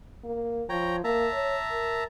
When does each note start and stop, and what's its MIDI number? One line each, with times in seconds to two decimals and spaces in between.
0.24 0.64 58
0.69 1.01 53
0.69 0.96 73
0.69 0.96 79
0.69 0.96 82
1.04 1.28 58
1.04 2.04 76
1.04 2.04 81
1.04 2.04 82
1.33 1.56 73
1.71 2.04 70